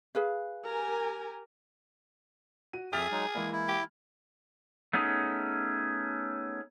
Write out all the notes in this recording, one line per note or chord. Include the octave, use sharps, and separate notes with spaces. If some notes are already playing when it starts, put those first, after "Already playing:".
G#4 B4 F5
G4 A#4 G#5
F#4 D#7
F2 G#4 E5 D#6 F6 A6 F7
F#3 G#3 D#4
E3 G#3 A#3 E4
E4
G4
A3 B3 C#4 D#4 G#4